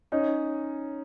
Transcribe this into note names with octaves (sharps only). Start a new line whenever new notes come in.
C#4 D#4